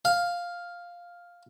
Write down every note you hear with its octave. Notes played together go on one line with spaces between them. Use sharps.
F5